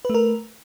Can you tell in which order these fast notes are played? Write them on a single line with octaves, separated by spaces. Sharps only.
B4 A3 A#4